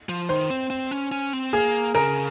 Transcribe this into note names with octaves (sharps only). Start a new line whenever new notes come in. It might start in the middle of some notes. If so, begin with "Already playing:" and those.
F3
D#3 C5
C4
C4
C#4
C#4
C4
A#3 G#4
C#3 A#4